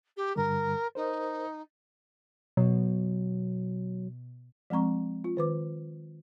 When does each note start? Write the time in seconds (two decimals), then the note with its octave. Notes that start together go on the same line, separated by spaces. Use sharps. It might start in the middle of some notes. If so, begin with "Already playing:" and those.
0.16 G4
0.36 G2 D3 G3 A#4
0.95 D#4 A#4 C5
2.57 B2 F#3
4.70 F3 G#3 C4 A#5 C#6
5.24 F4
5.37 D#3 B4 D6